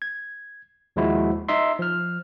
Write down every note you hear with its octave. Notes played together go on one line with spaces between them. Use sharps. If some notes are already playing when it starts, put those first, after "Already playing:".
G#6
D#2 F3 G#3 E4 F#4
D#4 D#5 E5 C6
F3 F6